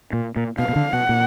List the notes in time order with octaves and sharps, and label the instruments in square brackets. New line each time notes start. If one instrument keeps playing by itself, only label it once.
[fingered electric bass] A#2
A#2
[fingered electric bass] B2 [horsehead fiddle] F5
[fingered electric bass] B2
D3
[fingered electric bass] B2 [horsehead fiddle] F#5
[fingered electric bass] A#2